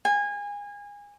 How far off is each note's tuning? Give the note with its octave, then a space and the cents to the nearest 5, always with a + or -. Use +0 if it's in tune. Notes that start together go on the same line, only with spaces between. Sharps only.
G#5 -25